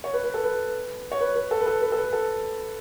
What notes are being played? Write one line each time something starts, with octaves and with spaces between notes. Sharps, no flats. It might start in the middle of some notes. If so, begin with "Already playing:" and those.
C#5
B4
B4
A4
B4
C#5
B4
B4
A4
B4
A4
B4
A4
B4
A4